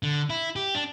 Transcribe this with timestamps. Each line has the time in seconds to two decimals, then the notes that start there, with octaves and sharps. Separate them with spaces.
0.03 D3
0.30 E4
0.56 G4
0.75 D4